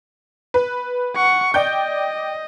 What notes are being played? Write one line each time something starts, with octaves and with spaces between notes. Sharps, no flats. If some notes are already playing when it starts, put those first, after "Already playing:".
B4
F#5 C#6
D5 D#5 G5 G6